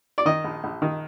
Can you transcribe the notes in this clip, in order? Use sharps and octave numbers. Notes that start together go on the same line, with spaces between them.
D5
D#3 D#5
A#1
A#1
D#3